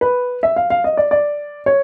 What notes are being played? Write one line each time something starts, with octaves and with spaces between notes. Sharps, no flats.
B4
E5
F5
F5
D#5
D5
D5
C#5